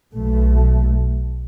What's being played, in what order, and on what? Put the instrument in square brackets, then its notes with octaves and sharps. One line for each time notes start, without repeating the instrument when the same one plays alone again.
[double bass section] B1 B2 A3